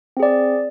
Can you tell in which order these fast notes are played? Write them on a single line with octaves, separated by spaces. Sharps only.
C4 G#4 D5